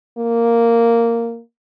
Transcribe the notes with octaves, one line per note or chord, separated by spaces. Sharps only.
A#3